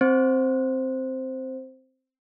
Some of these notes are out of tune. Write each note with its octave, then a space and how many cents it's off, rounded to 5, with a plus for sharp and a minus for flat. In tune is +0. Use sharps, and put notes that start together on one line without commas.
C4 +0 C5 +0